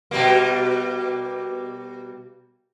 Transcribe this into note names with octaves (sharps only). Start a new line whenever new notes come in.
B2 G3 A#3